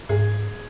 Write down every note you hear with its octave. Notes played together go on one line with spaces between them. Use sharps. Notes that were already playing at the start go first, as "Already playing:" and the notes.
G#2 G#4